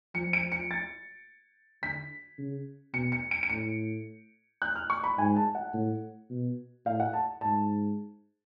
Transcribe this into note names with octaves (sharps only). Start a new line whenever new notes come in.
F3 C#7
D7
C#7
A6
D3 B6
C#3
B2 C#7
C#7
D7
D7
A2 C#7
F#6
F6
C#6
B5
G#2 G#5
A5
F#5
A2
B2
A2 F5
F#5
A5
G#2 A5